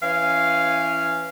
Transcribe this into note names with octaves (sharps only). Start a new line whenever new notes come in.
E3 C#4 F5